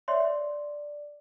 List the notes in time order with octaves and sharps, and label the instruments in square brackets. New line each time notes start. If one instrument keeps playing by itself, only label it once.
[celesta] C#5 D5 E5 C6
D5